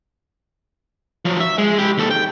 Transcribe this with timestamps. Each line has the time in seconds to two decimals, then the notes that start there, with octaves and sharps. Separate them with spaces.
1.25 F3 F#3
1.40 E5
1.58 G#3
1.78 E4 G4
1.98 D#2 A4
2.11 G5